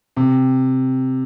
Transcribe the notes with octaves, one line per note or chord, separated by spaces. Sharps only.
C3